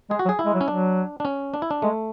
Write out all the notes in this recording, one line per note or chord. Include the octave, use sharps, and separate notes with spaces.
G#3 G#4
F#4
F#3
G#4
E4
G#3
F#3
C#4
F#3 D4
D4
C#4
D4
E4
D4
G#3 A3